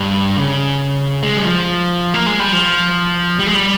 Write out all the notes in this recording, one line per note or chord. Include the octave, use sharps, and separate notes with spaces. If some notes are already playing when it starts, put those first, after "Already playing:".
Already playing: G2
C#3
G#3
G3
F3
A#3
G#3
G3
F3
G3
G#3
G3